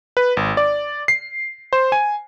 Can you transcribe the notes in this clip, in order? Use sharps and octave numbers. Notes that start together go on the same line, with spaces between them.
B4
G#1
D5
C7
C5
G#5